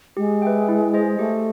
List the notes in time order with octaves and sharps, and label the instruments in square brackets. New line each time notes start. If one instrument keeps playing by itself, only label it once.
[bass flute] G#3 [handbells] G4
[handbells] B4 E5 G5
E4
G#4 C5 D#5
[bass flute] A3 [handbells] G4